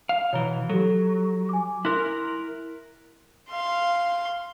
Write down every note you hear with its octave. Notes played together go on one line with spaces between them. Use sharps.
F5
B2 E3 C#5 A#5 G7
F#3 G4 A4
G#5 D6
E4 A#4 C6 F6 F#6
F5 C6